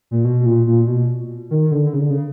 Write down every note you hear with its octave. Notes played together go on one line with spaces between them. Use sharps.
A#2
B2
B2
A#2
A#2
B2
D#3
D3
C#3
D3
C#3